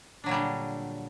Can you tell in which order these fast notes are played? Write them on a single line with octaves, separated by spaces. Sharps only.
D4 F#3 A#2 G3 D3